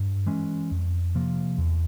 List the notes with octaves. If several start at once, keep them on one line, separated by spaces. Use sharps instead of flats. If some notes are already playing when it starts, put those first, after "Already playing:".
Already playing: G2
E3 G#3 C#4
F2
C3 F3 A#3
E2